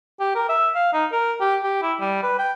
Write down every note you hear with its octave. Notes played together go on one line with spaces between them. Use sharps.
G4
A#4
E5
F5
D#4
A#4
G4
G4
E4
G3
B4
G5